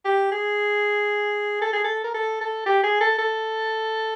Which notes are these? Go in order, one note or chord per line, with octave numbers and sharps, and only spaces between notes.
G4
G#4
A4
G#4
A4
A#4
A4
A4
G4
G#4
A4
A4